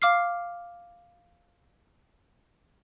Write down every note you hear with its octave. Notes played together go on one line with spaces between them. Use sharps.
F5 D6 F6 C7